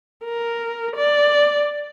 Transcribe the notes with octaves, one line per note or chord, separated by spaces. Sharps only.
A#4
D5